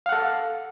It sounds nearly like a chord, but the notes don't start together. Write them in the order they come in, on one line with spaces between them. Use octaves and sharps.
F5 F#5 A4